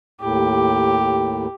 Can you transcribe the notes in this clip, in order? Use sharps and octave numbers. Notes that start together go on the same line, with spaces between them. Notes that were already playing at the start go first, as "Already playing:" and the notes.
D#2 A2 G4